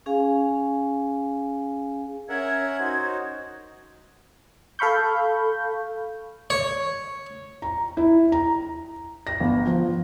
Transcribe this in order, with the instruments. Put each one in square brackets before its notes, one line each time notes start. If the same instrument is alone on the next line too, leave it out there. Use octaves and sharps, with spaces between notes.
[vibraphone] C#4 G#4 F5 G#5
[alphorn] C#4 [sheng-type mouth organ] A#4 E5 F#5 [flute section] G#6
[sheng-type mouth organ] D#4 F#4 C5
[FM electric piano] A4 F5 B5 C#6 G6
[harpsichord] C#5
[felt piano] A#5
E4
A#5
A#6
G1
F3